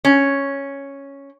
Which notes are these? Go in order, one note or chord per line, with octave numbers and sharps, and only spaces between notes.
C#4